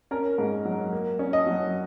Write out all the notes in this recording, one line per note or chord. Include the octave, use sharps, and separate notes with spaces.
C#4 A#4
G#2
F#3
A#3
C#4
D#5
F#3